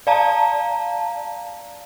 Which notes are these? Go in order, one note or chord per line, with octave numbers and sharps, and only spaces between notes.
D5 F5 A5 A#5